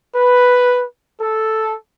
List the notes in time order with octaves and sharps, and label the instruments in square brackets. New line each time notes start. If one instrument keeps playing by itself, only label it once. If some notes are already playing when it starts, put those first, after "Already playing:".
[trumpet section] B4
A4